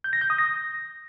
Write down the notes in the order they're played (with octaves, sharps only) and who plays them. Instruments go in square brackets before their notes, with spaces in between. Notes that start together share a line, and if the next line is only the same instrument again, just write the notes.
[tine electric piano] G6
A#6
G6
D#6
A#6